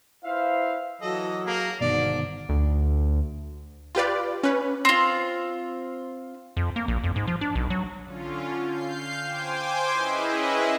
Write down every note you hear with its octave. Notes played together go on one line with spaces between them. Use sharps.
E4 B4 C5 E5 F5
E3 F#3 A4 D#5
A#3 G#4
G1 G#2 B2 D#3 D4 D5
D2
F4 G4 B4 D5
C#4 B4
C4 F4
F2
A#3
A#1
F2
G#2
F3
D4
B1
F#3
D3 C#4 F4
F5 G6 C7
C5 G5 G#5 C6 D6
C#4 E4 G#4 B4 D#5 E5